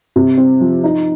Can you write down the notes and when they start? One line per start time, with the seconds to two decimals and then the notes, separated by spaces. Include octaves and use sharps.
0.16 C3
0.38 C4
0.60 F3
0.84 D#4